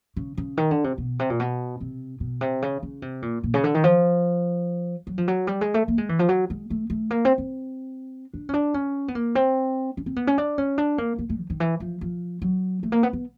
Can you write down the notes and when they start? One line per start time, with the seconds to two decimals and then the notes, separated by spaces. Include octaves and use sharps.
0.16 C#3
0.37 C#3
0.57 D#3
0.71 D3
0.84 C3
0.98 B2
1.19 C3
1.30 A#2
1.40 B2
1.80 C3
2.20 B2
2.41 C3
2.62 C#3
2.83 C#3
3.02 C3
3.22 A#2
3.43 A#2
3.54 C#3
3.64 D3
3.75 D#3
3.84 F3
5.07 F#3
5.18 F3
5.28 F#3
5.47 G3
5.61 G#3
5.74 A3
5.88 A#3
5.98 G#3
6.09 E3
6.19 F3
6.29 F#3
6.50 G#3
6.70 A3
6.90 A3
7.11 A#3
7.25 C4
7.38 C4
8.33 D4
8.49 C#4
8.53 D4
8.74 C#4
9.08 B3
9.15 A#3
9.35 C4
9.97 C#4
10.06 C4
10.16 B3
10.27 C#4
10.38 D4
10.58 C#4
10.78 D4
10.98 A#3
11.18 A#3
11.29 A3
11.40 D#3
11.50 D#3
11.60 E3
11.80 F3
12.01 F3
12.42 F#3
12.83 A3
12.92 A#3
13.03 B3
13.13 B3